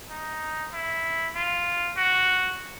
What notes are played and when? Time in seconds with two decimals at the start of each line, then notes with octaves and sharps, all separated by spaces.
0.10 D#4
0.73 E4
1.35 F4
1.97 F#4